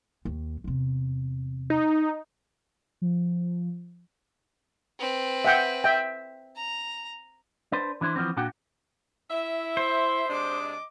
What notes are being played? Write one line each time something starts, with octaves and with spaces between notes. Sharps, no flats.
D#2
E2 C3
D#4
F3
C4 B4
E5 F#5 G5
E5 G5
A#5
D4 B4 C5
E3 D4 E4 C5
E3 F3 A3 B3 C4
A#2 A#3 D4 F#4 F#5 G5
E4 E5
C5
C3 G#3 D4 D#5 D6